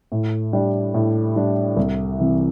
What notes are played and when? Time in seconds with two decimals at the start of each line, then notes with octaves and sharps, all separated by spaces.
0.12 A2
0.53 G3 D4
0.94 A2
1.36 G3 D4
1.77 C2
2.19 C3 E3